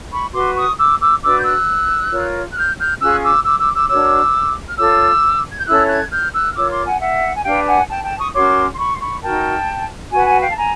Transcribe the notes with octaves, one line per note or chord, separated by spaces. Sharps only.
B5 C#6
F#4 B4 C6 D6
C#6 D#6
D6 E6
D6 E6
D4 F#4 B4 D6 E6
G6
E6 F#6
F4 A#4 C#5
F#6
F6 G6
F6 G6
C#4 F4 G#4 E6 F#6
D6 E6
D6 E6
D6 E6
D6 E6
D4 F#4 A#4 C#5 D6 E6
F6
F4 A4 C#5 D6 E6
G#6
G6
C#4 E4 A4 C#5 E6 F#6
F#6 G#6
F6 G6
E6 F#6
F6
F4 A#4 C#5 D6 E6
C6 D6
F#5 G#5
E5 F#5
G#5
D4 G4 B4 F5 G5
F#5 G#5
G5 A5
G5 A5
C#6 D#6
C#4 F#4 A#4 C#5 C6 D6
C6
B5 C#6
C6
B5 C#6
D#4 F#4 A#4 G5 A5
F#4 B4 F#5 G#5
F#5 G#5
F5 G5
A5
G#5 A#5